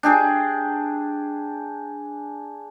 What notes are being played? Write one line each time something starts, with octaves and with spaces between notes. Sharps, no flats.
D4 G4 G#4